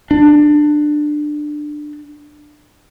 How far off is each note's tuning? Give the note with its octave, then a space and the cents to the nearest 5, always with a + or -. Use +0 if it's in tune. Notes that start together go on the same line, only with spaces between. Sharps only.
D4 +20